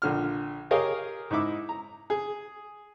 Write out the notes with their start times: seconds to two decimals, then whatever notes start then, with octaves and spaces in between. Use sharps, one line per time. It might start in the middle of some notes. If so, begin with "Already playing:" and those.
0.02 A#1 D3 F6
0.71 G4 G#4 A#4 C#5 D#5 F5
1.30 G#2 D#4 E4 D6 E6
1.69 A#5
2.10 G#4